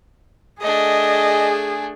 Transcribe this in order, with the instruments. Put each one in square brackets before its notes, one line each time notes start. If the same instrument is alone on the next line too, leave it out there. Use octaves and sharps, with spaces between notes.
[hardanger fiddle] A3 D4 [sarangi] G#4 [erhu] D#5